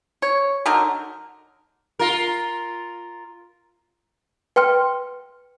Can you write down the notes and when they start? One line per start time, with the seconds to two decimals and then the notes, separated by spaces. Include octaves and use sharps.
0.22 C#5
0.66 D3 F#3 D#4 A#4
1.99 F4 A#4
4.56 B4 G5 C6 F6